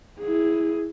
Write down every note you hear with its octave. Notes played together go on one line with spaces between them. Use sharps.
E4 G#4